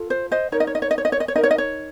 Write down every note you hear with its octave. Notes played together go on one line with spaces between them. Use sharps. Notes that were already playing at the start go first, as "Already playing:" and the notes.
Already playing: F4 A4
C5
C5 D#5
D#4 A#4 C#5
D#5
C#5
D#5
C#5
D#5
C#5
D#5
C#5
D#5
C#5
D#4 A#4 D#5
C#5
D#5
C#5